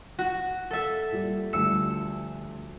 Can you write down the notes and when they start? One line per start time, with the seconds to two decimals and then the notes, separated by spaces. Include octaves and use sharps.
0.19 F#4
0.71 A4 E5
1.11 A#2 G3
1.53 D2 F3 G3 E6 C#7